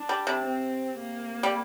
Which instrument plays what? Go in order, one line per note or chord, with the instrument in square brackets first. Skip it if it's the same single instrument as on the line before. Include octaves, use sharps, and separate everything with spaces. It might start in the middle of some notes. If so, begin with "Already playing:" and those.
Already playing: [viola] D4
[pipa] G3
C3
[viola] C4
A#3
[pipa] G3